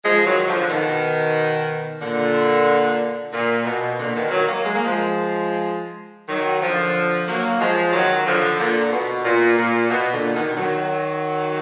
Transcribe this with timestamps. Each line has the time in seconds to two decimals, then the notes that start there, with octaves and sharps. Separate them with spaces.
0.04 F3 G#3
0.26 D#3 F#3
0.47 D3 F3
0.60 D3
0.69 B2 D#3
2.01 A#2 D3
3.33 A#2
3.65 B2
3.98 A#2 D3
4.15 B2 D#3
4.31 D#3 F#3
4.47 F#3 A#3
4.65 G#3
4.74 A#3
4.85 F3 G#3
6.28 D#3 F#3
6.61 D3 F3
7.27 F#3 A#3
7.60 F3 G#3
7.93 D#3 F#3
8.25 D3 F3
8.58 A#2 D3
8.92 B2
9.24 A#2
9.57 A#2
9.90 B2
10.13 A#2 D3
10.34 B2 D#3
10.56 D#3 F#3